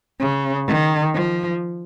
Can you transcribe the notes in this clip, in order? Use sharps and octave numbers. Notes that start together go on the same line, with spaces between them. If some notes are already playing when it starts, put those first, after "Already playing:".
C#3
D#3
F3